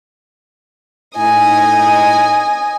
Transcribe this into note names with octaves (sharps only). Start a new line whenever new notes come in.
A2 D#4 D#5 G#5